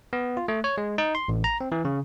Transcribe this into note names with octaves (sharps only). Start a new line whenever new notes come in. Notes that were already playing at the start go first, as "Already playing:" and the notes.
B3
F4
A3
C#5
G#3
D#4
C6
A1
A#5
C4
E3
C#3